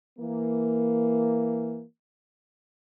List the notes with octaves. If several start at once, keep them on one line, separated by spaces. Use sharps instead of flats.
E3 A#3